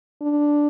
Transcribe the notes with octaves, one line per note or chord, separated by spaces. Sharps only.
D4